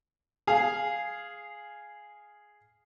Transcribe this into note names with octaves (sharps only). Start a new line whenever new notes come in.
G#4 F5